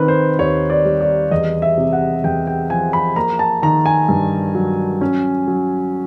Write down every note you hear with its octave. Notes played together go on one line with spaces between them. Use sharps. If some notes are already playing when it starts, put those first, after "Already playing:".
Already playing: D#3 C4 A#4 B4
C5
D#2 C#5
D5
G3
D5
E2 D#5
E5
C3
F#5
E2 G5
G5
F3 G#5
B5
A#3 A#5
A5
D#3 A#5
G#5
G2
F#3
C#4
F#3